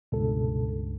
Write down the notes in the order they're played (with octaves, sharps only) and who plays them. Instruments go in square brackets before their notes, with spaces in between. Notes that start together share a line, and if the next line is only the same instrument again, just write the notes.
[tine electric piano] C#2 G2 [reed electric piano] B2 A4